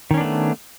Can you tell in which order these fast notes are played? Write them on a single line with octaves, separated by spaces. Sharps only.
D#3 C#4 D4 B3 A3